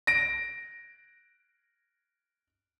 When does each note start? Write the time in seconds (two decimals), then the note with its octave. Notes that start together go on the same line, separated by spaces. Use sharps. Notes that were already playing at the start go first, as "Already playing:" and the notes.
0.07 A#6 D7